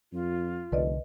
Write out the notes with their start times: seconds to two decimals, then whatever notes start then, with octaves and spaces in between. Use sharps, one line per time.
0.13 F2 F4
0.72 F1 C2 D3 B4 D5 D#5